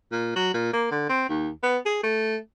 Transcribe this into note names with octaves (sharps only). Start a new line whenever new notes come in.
A#2
F#3
A#2
A#3
D3
C4
D#2
B3
G#4
A3